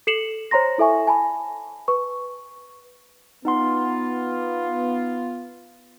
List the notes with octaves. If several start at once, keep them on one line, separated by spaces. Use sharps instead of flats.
A4 C7 C#7 E7 F#7
C5 C#5 A#5 C6 A#6
E4 A4 E5 G#5 C#6
G#5 A5 B5
B4 C#6
B3 D#4 F4 F#5 C6